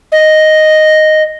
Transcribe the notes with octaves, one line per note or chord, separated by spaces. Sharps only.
D#5